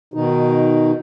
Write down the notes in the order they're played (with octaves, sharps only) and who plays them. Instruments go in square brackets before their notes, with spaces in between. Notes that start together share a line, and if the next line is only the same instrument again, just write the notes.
[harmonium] B2 D#3 D#4